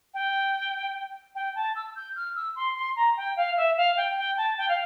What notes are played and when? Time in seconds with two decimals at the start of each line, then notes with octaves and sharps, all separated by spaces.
0.14 G5
1.35 G5
1.55 A5
1.75 E6
1.95 G6
2.16 F6
2.36 E6
2.56 C6
2.76 C6
2.96 A#5
3.17 G5
3.36 F5
3.57 E5
3.77 F5
3.97 G5
4.17 G5
4.37 A5
4.58 G5
4.69 F5